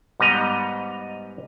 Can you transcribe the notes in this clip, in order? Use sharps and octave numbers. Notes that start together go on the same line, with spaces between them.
G#2 G3 B3 D#5 A#5